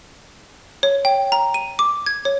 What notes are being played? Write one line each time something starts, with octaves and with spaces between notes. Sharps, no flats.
C#5
G5
A#5
D#7
D6
G#6
C#5